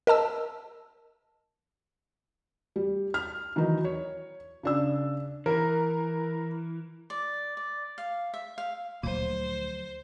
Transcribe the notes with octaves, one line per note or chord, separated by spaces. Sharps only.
A#4 D#5 A5 E6
G3
F6
D#3 E3 F#3 D#4
C#5
C#3 D4 E6
E3 A#4
D5
D5
F5
E5
F5
D2 A#2 F3 F#3 C5 D#7